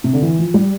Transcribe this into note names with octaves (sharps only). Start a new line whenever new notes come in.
C3
D3
E3
F3
G3